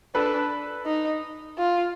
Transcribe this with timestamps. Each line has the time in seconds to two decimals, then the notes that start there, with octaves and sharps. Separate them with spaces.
0.15 D4 A4 B4
0.86 D#4
1.58 F4